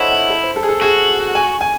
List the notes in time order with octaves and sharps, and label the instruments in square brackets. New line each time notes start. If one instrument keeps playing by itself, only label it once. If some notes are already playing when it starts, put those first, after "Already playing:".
Already playing: [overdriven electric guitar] E4 [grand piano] A4 C5 C#5 D#5 F#5
[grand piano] F#5
A4
C5
A4
G#4
A4
[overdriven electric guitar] F#4 [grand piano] G#4
[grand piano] G#5
G#5